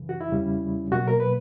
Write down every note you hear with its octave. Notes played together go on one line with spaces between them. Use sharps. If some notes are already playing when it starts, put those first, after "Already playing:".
Already playing: F#2 C#3 E3
F#4
E4
E2 C#3 G3 C#4
B2 F#3 A#3 F#4
A#4
B4